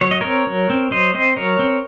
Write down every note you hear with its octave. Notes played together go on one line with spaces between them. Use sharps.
F#3 C#5
D#5
C4 A#4 C#5
F#3
C4
F#3 C5 D#5
C4 C5 D#5
F#3 A#4 C#5
C4